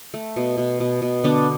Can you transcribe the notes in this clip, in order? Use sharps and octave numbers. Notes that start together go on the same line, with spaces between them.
A3
B2
B2
B2
B2
D3 B3 D4